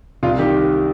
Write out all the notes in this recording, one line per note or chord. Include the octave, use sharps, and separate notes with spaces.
C2 F4
D#3 G4